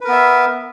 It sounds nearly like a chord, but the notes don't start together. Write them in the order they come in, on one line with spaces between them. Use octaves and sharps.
B4 A#4 B3 E5